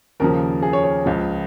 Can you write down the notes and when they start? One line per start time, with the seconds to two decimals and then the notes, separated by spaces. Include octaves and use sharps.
0.20 D#2 C#3 F3 A#4
0.62 G#4
0.73 C#5
0.84 C#5
1.06 C#2 C#3 F3